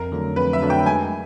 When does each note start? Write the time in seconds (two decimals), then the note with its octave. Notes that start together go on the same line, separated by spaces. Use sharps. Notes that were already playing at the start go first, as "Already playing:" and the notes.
Already playing: F2 A#4
0.12 D3 F#3 A3 D4
0.36 F2 B4
0.53 E5
0.62 D3 F#3 A3 D4
0.70 G5
0.86 G#3 G#5